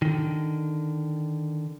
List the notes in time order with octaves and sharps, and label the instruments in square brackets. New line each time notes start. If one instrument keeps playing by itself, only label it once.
[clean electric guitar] D3 D#3